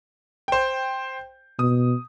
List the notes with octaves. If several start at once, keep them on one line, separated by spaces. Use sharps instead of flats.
C5 G5
B2 D#6